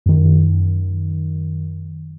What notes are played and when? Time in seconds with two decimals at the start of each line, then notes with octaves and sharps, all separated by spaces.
0.06 F#2 D#3